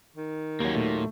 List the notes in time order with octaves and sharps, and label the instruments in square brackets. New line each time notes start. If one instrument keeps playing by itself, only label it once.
[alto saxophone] D#3
[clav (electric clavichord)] D#2 F#3 [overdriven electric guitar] A#3 C#4
[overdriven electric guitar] A#2 [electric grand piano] A3